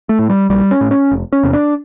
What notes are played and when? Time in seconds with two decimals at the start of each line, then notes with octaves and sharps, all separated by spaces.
0.09 A3
0.19 A2
0.30 G3
0.50 A#1 G3
0.71 C#4
0.81 A2
0.91 C#4
1.11 F1
1.32 C#4
1.43 E2 C3
1.53 D4